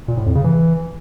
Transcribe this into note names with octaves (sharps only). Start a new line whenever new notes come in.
A#2
A2
F2
C#3
E3